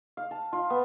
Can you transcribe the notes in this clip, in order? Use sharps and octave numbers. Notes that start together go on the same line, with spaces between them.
F5
A5
F4
B3